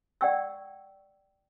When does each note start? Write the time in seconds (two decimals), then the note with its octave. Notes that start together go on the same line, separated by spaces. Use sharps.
0.21 D5 F#5 G5 C#6 E6